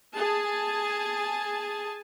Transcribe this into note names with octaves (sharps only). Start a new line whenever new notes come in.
G#4 G#5 A5